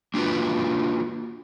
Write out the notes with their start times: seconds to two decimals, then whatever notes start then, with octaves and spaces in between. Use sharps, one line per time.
0.14 A#3 D4 F4 F#4 B4